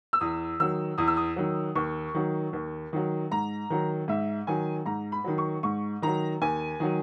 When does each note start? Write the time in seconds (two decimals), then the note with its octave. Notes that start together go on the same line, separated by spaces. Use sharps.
0.13 E6
0.21 E2 D#6
0.60 D#3 F#3 E6
0.98 E2 D#6
1.08 E6
1.17 D#6
1.36 D#3 F#3
1.75 D#2 C#6
2.14 D#3 F#3
2.53 D#2
2.93 D#3 F#3
3.31 G#2 A#5
3.70 D#3 F#3
4.08 G#2 E5
4.47 D#3 F#3 G#5
4.86 G#2 A#5
5.12 B5
5.24 D#3 F#3
5.38 C#6
5.63 G#2 C#6
6.02 D#3 F#3 A#5
6.42 D#2 G#5
6.80 D#3 F#3